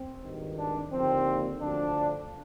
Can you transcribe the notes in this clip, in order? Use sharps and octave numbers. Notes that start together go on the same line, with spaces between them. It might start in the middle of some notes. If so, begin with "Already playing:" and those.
Already playing: C4
G#1 G2 D#3
D4
D#2 D3 F3 C4
D2 D3 F3 D4